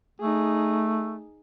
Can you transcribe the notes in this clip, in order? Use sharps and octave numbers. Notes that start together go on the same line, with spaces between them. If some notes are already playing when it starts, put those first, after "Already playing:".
A3 D#4 G#4